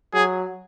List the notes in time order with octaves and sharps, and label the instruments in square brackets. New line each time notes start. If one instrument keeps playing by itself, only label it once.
[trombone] F#3 [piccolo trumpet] G#4